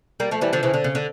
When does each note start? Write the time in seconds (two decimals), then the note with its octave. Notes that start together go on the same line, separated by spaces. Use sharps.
0.20 G3 A#3
0.31 F3 A3
0.41 E3 G3
0.53 D3 F3
0.63 C#3 E3
0.74 D3
0.84 C#3
0.95 D3